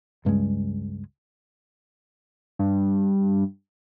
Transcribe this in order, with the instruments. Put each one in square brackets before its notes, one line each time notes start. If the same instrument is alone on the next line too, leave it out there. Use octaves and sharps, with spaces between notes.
[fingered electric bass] C#2 G2 C#3 G#3
[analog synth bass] G2